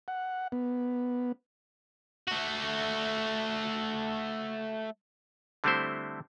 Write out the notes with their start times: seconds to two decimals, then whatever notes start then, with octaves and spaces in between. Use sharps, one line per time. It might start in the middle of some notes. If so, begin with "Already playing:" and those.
0.08 F#5
0.52 B3
2.28 A3 F#4
5.64 D3 G3 A3 C4 E4 C5